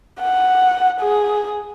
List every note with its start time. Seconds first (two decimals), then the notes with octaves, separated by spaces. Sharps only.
0.20 F#5
1.01 G#4